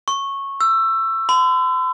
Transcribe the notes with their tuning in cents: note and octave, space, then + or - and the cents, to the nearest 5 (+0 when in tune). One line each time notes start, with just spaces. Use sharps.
C#6 -15
E6 +15
C6 -45